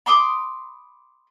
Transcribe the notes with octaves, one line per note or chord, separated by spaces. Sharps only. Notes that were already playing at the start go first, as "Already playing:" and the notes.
B5 C6 D6 D#6